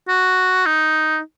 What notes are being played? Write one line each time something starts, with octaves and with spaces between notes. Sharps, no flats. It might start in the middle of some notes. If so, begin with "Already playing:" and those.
F#4
D#4